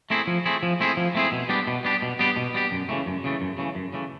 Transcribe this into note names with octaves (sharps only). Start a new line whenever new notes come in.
A3 C4 E4 G#4
F3
A3 C4 E4 G#4
F3
A3 C4 E4 G#4
F3
A3 C4 E4 G#4
B2
G3 B3 D4 G4
B2
G3 B3 D4 G4
B2
G3 B3 D4 G4
B2
G3 B3 D4 G4
F#2
C#3 E3 A3
F#2
C#3 E3 A3
F#2
C#3 E3 A3
F#2
C#3 E3 A3